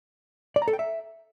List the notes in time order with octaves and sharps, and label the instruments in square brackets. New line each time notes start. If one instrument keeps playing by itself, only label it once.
[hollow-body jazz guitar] D5
A#5
A4
G5
E5